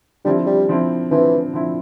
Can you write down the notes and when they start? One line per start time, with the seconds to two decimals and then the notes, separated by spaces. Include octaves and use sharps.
0.25 D3 F3 G3 C4 E4
0.46 G3
0.68 D3 F3 C4 E4
1.11 D3 E3 F3 C4 E4
1.53 D3 F3 C4 E4